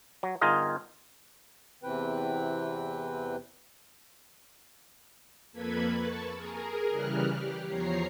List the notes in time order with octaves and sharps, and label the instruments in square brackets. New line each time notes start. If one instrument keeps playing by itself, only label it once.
[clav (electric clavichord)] F#3
G1 D#4 F4 G#4 A#4 D#5
[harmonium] E2 C3 E3 C4 B4 G5
[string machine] F2 A#3 A4 B4 B5 G#6
A5 C#6
G#4 A#4
C#3 E3 G3 F6 F#6
G4
E2 F3 C#5 A#5 C7